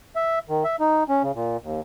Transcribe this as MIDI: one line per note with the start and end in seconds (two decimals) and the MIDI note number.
0.16 0.39 76
0.49 0.64 51
0.64 0.76 76
0.80 1.04 63
1.09 1.22 61
1.23 1.32 49
1.35 1.57 46
1.63 1.81 39